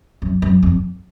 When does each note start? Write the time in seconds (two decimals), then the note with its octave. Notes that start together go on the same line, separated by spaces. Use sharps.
0.22 F#2
0.42 F#2
0.63 F2